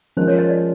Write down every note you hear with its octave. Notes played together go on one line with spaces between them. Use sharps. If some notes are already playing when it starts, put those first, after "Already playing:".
F3 G#3 C#4 F4 A#4 C5
C#5
D#5
D5